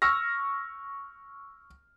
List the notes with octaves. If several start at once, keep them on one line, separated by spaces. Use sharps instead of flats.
C#6 E6 F6 A#6